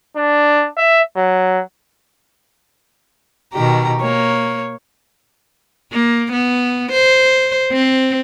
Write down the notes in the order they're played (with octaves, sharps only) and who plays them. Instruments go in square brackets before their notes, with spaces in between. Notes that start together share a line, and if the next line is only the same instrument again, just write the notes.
[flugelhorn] D4
E5
F#3
[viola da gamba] B2 D#3 G4 [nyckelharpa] A#5
[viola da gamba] A#3 [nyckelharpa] C#5
[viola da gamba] A#3
B3
C5
C4